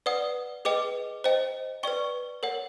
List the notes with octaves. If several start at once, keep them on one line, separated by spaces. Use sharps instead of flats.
B4 D5 F#5 D#6
G#4 B4 D#5 G5 D6
C5 D#5 G5
B4 D5 G5 C#6
A#4 C#5 F#5